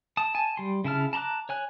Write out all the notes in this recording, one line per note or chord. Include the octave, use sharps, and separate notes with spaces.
A5 D#6
G#5 A5
G3 C6
C#3 E4 A5 F6
A5 A#5 C6 D6 F#6
C#5 G#5 F#6